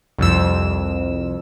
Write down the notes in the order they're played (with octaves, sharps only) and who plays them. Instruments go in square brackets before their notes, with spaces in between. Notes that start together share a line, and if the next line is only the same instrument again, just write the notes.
[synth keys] C2 F2 E6